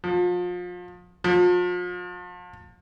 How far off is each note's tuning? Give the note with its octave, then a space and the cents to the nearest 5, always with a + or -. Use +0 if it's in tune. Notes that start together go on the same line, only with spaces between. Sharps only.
F3 +35
F3 +40